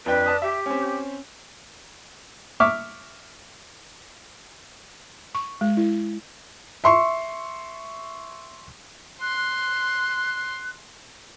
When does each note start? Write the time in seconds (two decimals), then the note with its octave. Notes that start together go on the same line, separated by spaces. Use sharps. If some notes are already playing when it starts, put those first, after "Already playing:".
0.06 F2 D4 B4 G5
0.26 D5 A5 D#6
0.42 G4 E5
0.66 C4 C#4
2.60 E5 C#6 D6 F6
5.35 C#6
5.61 G#3
5.77 E4
6.84 E5 C6 C#6
9.22 C6 F#6